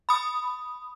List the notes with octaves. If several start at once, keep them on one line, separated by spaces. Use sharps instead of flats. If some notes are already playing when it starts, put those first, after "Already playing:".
B5 D#6